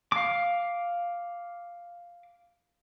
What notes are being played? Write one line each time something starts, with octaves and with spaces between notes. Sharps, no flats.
F5 D6